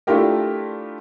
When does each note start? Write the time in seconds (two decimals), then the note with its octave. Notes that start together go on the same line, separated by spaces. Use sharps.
0.07 A3 D4 E4 F4 G4 A#4